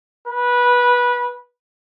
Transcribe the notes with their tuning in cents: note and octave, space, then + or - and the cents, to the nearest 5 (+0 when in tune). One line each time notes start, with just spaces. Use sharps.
B4 -20